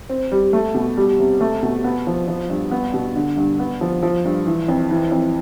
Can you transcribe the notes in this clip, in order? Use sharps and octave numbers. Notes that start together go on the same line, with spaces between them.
C4
G3
A3
B2
G3
C3
A3
B2
B3
F3
F3
G2
B3
B2
D3
G2
B3
F3
F3
G2
E3
F2
E3
F2